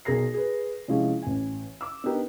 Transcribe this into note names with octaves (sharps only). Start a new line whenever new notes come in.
B1 G#4 A#4 A#6 C7
G#4 B4
C3 F3 G#3 C#4 E4 G#4
A1 G#5
D6 E6
B3 D4 D#4 G4 A#4 B4